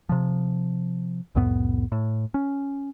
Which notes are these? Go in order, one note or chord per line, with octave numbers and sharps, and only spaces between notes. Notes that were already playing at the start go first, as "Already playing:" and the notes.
C3 F3
C2 F2 A2 B3
A2
C#4